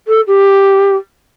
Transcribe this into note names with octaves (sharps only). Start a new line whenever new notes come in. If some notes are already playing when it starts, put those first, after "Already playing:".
A4
G4